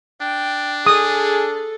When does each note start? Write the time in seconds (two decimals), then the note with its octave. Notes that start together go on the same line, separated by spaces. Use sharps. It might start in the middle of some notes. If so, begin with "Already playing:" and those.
0.21 D4 G5
0.87 G#4 A4 D#6